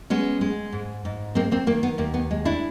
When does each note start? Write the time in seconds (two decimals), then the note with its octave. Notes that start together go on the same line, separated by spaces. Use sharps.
0.10 G#3 B3 C#4
0.41 G#3
0.72 G#2
1.05 G#2
1.35 G#3 A#3 C4
1.51 A#3 C4
1.67 D#3 A#3
1.83 B3
1.98 D#2 A#3
2.14 B3
2.31 G#3
2.45 D4 E4